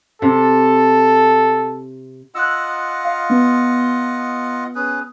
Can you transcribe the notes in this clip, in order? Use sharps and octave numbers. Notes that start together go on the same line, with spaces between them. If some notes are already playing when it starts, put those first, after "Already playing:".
C3 A4
F4 D#5 F#5 E6 F#6
F5
B3
C#4 G#4 B4